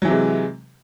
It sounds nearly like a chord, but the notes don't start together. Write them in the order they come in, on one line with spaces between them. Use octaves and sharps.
F#3 E3 C3 G#3